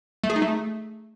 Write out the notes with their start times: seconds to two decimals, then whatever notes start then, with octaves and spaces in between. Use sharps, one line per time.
0.24 A3
0.30 G#4
0.36 D#4
0.42 A3